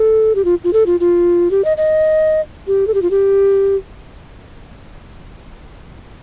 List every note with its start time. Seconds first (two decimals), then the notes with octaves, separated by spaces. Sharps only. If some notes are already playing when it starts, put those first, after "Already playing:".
Already playing: A4
0.35 G4
0.45 F4
0.64 F4
0.73 A4
0.86 F4
1.00 F4
1.51 G4
1.65 D#5
1.77 D#5
2.67 G4
2.87 A4
2.94 G4
3.02 F4
3.11 G4